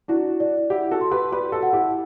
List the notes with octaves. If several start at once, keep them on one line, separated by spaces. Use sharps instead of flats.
D4 E4 F#4
D5
E4 G4 F#5
F#4 A4
C6
G4 B4
G4 B4 D5
F#4 A4
F#5
E4 G4